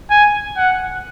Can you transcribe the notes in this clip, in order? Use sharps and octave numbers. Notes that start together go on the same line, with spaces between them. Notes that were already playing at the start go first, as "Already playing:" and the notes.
G#5
F#5